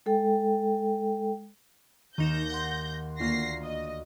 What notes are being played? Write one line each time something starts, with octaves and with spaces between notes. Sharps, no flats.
G#3 A4 G5
D#2 D#3 D#4 G6 A#6 E7
F#5 C6
D2 A#3 F4 F#4 A#6 C7
D#5